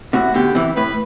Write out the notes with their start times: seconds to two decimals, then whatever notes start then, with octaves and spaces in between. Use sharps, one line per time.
0.13 A2 C3 F#4
0.34 B2 D3 G4
0.55 C3 E3
0.76 A2 B4